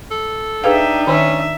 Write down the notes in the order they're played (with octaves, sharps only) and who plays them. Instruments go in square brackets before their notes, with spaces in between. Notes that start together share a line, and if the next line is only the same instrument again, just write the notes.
[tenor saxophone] A4
[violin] D4 D#4 [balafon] G#4 B4 F5 [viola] E5 G5
[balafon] D#3 [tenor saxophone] C#4 [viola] E5